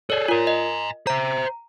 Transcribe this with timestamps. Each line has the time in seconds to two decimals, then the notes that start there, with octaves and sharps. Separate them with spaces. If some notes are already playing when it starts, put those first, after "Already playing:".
0.10 G#4 A4 C#5 D5
0.28 F4 A#4 G#5 A#5
0.47 D#5
1.07 C5 E5 A#5